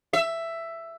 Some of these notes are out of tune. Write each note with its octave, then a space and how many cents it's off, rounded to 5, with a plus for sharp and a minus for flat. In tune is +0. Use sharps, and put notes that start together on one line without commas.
E5 +10